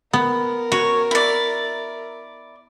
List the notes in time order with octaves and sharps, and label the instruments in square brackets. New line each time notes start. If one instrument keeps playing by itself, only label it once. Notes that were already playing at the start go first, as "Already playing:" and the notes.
[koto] B3 [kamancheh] A#4
[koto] F#4 [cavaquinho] C#5
[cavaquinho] E4 D5